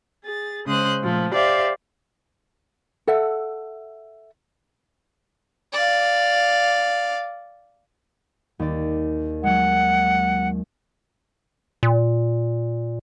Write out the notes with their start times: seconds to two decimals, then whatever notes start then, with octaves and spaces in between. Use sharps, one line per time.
0.24 G#4 A6
0.66 C#3 G#3 C5 D#6 F#6
1.02 A#2 F3 A3
1.33 G4 C5 D5 E5 F5
3.07 A4 E5 F#5
5.73 D5 F5
8.59 D#2 D5
9.43 F#3 G#3 F#5
11.83 A#2